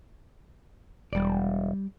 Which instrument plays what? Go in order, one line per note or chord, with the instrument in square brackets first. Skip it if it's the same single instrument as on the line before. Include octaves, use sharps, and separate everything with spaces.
[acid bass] E1 [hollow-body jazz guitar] G3 D5